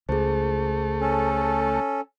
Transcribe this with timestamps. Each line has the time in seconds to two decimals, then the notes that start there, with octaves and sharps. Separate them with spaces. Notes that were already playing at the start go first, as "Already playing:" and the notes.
0.09 C#2 A3 G#4 C5
1.01 C#4 A4